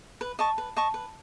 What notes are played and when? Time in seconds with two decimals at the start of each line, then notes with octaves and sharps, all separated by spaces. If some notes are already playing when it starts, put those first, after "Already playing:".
0.21 B4
0.39 D#5 A5 C#6
0.58 B4
0.76 D#5 A5 C#6
0.94 B4